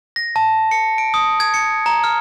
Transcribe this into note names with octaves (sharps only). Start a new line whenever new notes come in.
A#6
A5
C#7
D7
D#6
G#6
C#7
A#5
F6